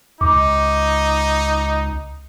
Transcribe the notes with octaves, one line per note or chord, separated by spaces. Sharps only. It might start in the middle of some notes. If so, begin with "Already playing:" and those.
C#2 D#4 D6